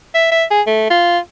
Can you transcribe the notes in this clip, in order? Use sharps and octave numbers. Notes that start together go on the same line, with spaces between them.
E5
E5
G#4
A3
F4